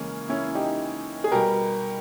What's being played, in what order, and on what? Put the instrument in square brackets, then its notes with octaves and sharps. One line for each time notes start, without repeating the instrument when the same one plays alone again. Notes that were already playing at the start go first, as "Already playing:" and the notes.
Already playing: [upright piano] C#3 E3 G#3 A#3 C#4
C#4 E4
D#4 G4
G#4
B2 G3 G4 A#4